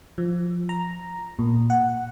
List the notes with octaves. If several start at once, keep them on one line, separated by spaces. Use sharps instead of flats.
F3
A#5
A#2
F#5